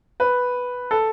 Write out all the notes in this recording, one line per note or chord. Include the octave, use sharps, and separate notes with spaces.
B4
A4